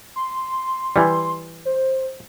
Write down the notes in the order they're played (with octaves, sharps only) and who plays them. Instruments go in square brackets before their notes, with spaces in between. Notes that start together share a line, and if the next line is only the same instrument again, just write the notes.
[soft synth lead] C6
[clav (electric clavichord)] E3 G3
[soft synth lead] C5